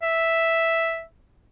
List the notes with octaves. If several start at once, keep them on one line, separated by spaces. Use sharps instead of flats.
E5